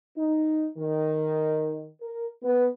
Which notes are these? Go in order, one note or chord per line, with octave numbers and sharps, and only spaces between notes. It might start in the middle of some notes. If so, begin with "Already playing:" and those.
D#4
D#3
A#4
B3